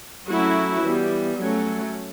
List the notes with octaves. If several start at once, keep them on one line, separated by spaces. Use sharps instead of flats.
F#3 A3 C#4 E4 F#4
E3 G3 B3
F#3 A3 C#4